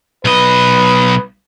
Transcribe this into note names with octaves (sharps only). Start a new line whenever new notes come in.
B1 B4 D#5